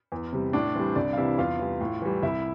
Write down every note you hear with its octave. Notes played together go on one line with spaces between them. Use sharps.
E2
C3 G3
A2 D4 D5
E3 G3 C4 C5
C2 D4 D5
F5
C3 E3 G3 E4 E5
E2 F4 F5
E3 G3
A2
E3 G3
C2 E4 E5